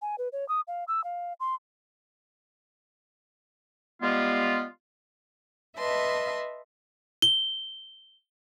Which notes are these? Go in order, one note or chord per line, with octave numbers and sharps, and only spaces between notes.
G#5
B4
C#5
D#6
F5
E6
F5
C6
G3 G#3 B3 F4
B4 D#5 E5 A5 C6
G7